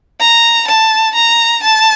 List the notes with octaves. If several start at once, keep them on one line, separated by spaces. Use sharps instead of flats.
A#5
A5
A#5
A5